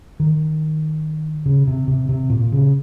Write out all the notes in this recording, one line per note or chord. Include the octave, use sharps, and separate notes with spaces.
D#3
C#3
C3
C3
C3
A#2
C#3